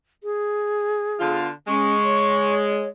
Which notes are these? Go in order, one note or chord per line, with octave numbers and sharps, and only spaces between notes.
G#4
D3 B3 F4
G#3 C#4 C#6
C#5